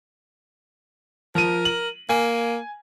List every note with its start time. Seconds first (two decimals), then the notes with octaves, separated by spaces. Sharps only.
1.35 F3 A#4 D#7
1.65 F#7
2.09 A#3 G#5